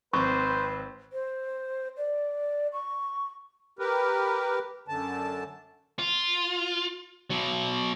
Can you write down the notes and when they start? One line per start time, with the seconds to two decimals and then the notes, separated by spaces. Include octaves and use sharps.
0.13 G#1 C4 B4 C5 C#6
1.13 C5
1.97 D5
2.73 C#6
3.79 G4 A#4 B4
4.88 F#2 D3 A5
5.99 F4
7.30 B2 F#3